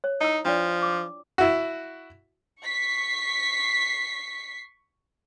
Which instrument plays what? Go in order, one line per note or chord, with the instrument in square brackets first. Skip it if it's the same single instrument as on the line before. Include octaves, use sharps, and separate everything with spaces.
[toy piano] C#5
[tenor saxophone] D#4 [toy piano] E4 E6
[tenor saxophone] F3 [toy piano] D4 F4 D5
[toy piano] D6
[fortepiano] E4 F#4
[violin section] C#6 B6 C7